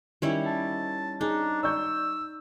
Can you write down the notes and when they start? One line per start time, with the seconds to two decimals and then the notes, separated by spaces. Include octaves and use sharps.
0.22 D#3 G3 C#4 E4
0.46 A5
1.21 D4 D#4 G#4
1.63 D5 C#6 E6 G6